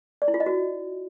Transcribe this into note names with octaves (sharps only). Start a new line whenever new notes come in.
D5
E4
F4
D#5
F#4